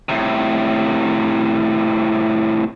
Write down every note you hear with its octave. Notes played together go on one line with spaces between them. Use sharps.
A2 C3